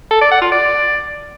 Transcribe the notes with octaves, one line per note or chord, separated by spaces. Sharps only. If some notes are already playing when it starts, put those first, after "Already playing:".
A4
D5
F#5
F4
D5